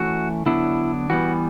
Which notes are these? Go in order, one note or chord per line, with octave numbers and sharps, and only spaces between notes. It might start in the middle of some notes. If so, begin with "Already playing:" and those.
Already playing: E3 A3 C#4 F#4
D3 F#3 B3 D4 E4
E3 G3 B3 F#4